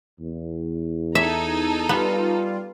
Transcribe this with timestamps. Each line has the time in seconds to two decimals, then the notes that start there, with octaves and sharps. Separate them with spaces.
0.19 E2
1.15 D#4 A4 E5 A#5 G#6
1.89 G3 B3 F4